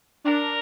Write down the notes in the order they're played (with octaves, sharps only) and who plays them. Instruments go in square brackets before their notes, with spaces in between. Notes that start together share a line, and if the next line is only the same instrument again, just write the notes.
[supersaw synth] D4 [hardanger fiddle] A#4